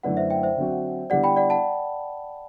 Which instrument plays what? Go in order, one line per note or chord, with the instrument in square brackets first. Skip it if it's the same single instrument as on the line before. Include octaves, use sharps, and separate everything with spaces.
[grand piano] F#2 D3 A3 E4 B4 [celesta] D5 F#5
[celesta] C5 E5
E5 G5
C5 E5
[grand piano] D3 F#3 C4 F#4
[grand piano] D3 G3 B3 E4 G4 [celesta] D5 F#5
[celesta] G5 B5
D5 F#5
F#5 A5